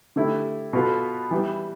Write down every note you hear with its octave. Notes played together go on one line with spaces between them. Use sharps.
D3 A3 E4 G4
B2 B3 F4 A4
E3 G3 B3